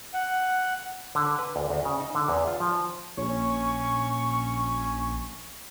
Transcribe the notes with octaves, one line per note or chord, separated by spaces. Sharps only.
F#5
D3
B4
D2
D2
C#3
D#4
D3
E2
F4
F3
A#1 C#4 C#5 C#6